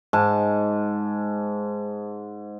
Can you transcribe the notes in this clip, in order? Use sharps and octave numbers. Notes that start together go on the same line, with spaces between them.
G#2 A5